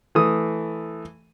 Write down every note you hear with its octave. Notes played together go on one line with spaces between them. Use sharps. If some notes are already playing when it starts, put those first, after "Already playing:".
E3 A3 D#6